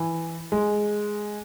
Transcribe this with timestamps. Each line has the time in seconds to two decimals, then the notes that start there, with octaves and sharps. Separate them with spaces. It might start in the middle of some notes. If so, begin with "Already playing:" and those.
Already playing: E3
0.52 G#3